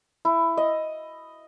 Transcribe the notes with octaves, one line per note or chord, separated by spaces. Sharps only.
E4
D#5